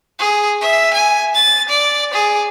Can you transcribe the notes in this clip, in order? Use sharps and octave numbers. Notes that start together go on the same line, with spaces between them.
G#4
E5
G#5
A6
D5
G#4